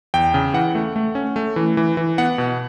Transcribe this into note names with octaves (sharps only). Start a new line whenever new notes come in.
E2 G5
C#3
E3 F#5
A3
A3
C#4
A3
E3
E3
E3
B3 F#5
B2